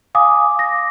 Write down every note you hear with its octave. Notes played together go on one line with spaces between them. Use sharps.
F5 G#5 D6 D#6
D6 A#6